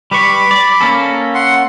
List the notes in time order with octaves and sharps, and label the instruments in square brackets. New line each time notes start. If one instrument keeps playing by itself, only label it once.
[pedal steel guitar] G3 B4 C#6 [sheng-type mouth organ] B5 D6
[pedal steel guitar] D5
A#3 C#4 A4
[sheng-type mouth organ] F#5 C6